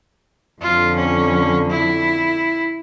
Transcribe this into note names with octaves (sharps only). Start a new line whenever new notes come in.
F2 D3 F4
C#4
E4